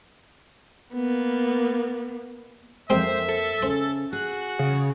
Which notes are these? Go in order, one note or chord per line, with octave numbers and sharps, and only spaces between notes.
A#3 B3
F2 G#3 A#3 C4 C5 E5
A4
C#3 C5
F#4 G#4 F#6
C#3